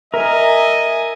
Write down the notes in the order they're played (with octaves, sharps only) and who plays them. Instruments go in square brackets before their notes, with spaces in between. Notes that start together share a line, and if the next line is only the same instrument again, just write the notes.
[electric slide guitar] A#4 [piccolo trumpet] D#5 [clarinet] E5 [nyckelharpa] G#5